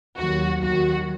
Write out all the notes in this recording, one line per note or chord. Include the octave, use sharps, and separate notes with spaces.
D#2 D#3 F#3 F#4
D#2 D#3 F#3 F#4